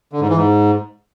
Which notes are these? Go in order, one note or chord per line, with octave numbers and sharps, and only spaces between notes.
D3
G#2
E3
G#2